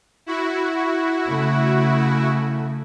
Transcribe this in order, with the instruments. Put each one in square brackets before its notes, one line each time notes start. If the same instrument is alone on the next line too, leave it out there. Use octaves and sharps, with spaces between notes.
[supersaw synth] E4 F#4
[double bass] C#3 A3